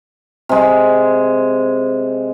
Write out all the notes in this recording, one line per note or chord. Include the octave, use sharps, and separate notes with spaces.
C3 G#3